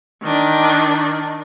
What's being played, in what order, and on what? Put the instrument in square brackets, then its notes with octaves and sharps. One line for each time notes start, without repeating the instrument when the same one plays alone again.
[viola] D#3 D4